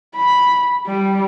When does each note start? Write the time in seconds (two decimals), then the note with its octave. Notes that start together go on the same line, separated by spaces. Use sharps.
0.16 B5
0.87 G3